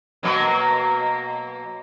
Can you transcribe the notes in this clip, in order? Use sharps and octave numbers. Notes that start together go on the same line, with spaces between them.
B2 F#3 A#3